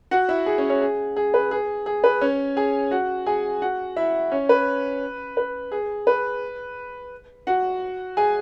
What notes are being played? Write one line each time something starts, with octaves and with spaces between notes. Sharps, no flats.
F#4 F#5
E4 E5
G#4
C#4 C#5
C#4 C#5
G#4
G#4
B4
G#4
G#4
B4
C#4 C#5
G#4 G#5
F#4 F#5
G#4 G#5
F#4 F#5
E4 E5
C#4 C#5
B4
B4
G#4
B4
F#4 F#5
G#4 G#5